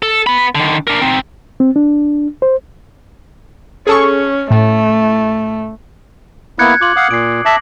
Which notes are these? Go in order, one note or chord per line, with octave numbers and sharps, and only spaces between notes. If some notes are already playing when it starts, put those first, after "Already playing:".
A4
B3 B5
D3 D#3
D4 A#4
C4 D#4
C4
D4
C5
C#4 G#4 A4 C#6
A2 A3
A#3 B3 E4 F#6 G#6 C#7
F4 D6 C#7 F#7
F5 F#5 D#6
A#2 C7 D7
E5 A5 D6 A#6 F#7